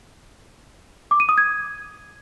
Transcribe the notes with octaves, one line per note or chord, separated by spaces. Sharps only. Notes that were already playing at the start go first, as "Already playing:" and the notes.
D6
D#7
D#6
G#6